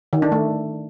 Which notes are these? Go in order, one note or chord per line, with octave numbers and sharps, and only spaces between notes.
D#3
D4
A3